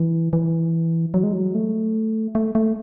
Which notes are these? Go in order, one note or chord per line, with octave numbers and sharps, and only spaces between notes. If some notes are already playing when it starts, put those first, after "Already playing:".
Already playing: E3
E3
F#3
G#3
F#3
A3
A3
A3